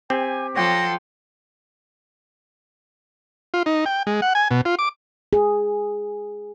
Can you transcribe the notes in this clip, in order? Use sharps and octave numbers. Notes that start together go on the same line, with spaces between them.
C4 G4 G#5
F3 A4 C#5 F#5 G5 C6 A#6
F4
D#4
G5
G#3
F#5
G#5
B2
F4
D6
G#4